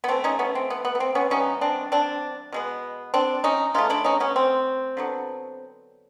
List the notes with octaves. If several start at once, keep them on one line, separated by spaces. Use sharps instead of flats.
B3
E3 A3 C4
C#4 D#4
B3 C#4
C4
B3
B3
B3
C4
B3 C#4
E3 G3 B3 C#4 D#4
C4 D4
C4 D4
B2 G#3 B3
C4 D4
C#4 D#4
C#3 E3 A3 D#4 F4
D4 E4
C#4 D#4
B3 C#4
C4
D3 F#3 B3